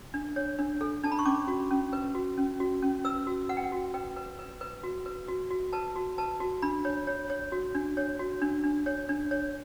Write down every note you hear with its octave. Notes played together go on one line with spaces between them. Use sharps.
D4
C#5
D4
A4
D4 A5
B5
C#6
C#4 D6
F#4
C#4
B4
F#4
C#4
F#4
C#4
B4 E6
F#4
B4 F#5
G5
F#5
F#4
B4 G5
B4
B4
B4
F#4
B4
F#4
F#4
B4 A5
F#4
B4 A5
F#4
D4 B5
C#5
C#5
C#5
F#4
D4
C#5
F#4
D4
D4
C#5
D4
C#5